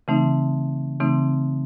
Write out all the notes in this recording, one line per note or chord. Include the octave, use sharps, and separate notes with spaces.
C#3 E3 A3 C4 D#4
C#3 E3 A3 C4 D#4